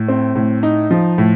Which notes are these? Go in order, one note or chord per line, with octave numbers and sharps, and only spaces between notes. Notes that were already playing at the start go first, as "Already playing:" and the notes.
Already playing: A2
C4
A2
D#4
F3
A2